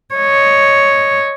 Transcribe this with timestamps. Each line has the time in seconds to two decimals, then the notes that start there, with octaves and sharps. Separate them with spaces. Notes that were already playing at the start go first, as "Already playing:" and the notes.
0.15 C#5 D#5